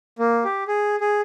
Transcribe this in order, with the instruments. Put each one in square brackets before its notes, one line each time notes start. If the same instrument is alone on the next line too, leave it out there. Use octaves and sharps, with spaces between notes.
[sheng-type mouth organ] A#3
G4
G#4
G#4